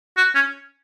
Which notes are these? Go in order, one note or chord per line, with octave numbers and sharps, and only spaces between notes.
F#4
C#4